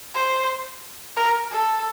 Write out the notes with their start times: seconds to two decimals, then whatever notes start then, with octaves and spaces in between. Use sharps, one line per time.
0.14 C5
1.16 A#4
1.51 A4